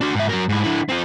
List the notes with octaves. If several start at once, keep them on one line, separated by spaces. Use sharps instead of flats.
D4 F#4
G#2 E5
F#3 A#4
G#2 E4
D3 E4
C4 F4